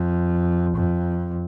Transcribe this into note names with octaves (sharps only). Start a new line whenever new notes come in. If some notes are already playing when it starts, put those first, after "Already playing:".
Already playing: F2
F2